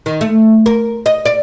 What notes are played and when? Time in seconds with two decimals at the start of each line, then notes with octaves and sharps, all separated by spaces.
0.06 D#3
0.21 A3
0.66 A#4
1.06 D#5
1.25 D5